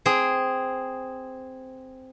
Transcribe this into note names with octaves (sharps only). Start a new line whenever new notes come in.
C4 G#4